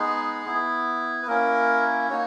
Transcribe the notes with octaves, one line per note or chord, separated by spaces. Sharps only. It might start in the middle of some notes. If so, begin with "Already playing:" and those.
Already playing: G#3 B3 D#4 G#4
B3 E4
B4
A#3 C#4 E4 A#4
A#3 D#4 F#4 C#5